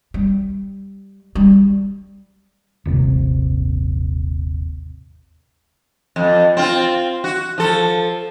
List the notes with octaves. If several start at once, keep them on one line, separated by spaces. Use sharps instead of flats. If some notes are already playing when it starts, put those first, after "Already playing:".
G3
G3
D#1 G#1 C3
F2
C4 F4
F#4
F3 A4